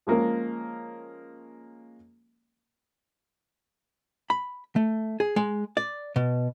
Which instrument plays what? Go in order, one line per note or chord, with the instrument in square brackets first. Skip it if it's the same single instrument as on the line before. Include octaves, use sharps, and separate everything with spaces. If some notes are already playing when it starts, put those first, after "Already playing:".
[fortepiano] F3 G#3 A#3 C#4 A#4
[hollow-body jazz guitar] B5
A3
G#4
G#3
D5
B2